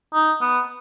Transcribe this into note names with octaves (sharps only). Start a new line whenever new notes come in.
D#4
B3